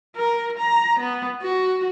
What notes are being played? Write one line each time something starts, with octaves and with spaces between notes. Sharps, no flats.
A#4
A#5
B3
F#4